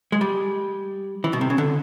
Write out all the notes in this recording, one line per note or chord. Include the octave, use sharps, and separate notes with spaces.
G#3
G3
E3
B2
C3
C#3
D3